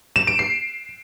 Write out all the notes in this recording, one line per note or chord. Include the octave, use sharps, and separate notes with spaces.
E7
D7
C7